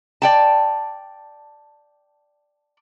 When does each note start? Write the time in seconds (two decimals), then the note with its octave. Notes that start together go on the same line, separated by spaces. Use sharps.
0.22 D5 G5 A5